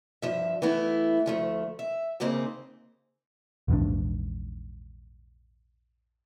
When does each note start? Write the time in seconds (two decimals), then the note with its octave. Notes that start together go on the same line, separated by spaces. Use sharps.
0.22 G2 F3 E5
0.62 E3 A3 B3 E4
1.26 D2 F3 A3
1.79 E5
2.20 D#2 C#3 A#3 C4 D#4
3.68 A#1 E2 G#2 D4